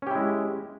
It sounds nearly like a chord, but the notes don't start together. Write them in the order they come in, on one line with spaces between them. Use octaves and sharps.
C#4 G4 E4 G#3